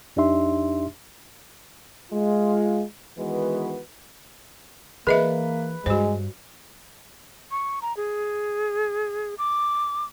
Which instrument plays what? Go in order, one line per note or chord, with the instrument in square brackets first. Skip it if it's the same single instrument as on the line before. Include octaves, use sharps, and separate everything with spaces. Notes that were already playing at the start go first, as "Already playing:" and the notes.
[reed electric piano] F2 D4 D#4 G4 E5 C6
[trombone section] G#3 F4
D#3 E3 G#3 B3 F#4 B4
[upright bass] E3 [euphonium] A#3 [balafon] G#4 D#5 E5 [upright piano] B4
[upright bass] G2 [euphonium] G#3 [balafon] F#4 C5
[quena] C#6
A#5
G#4
D6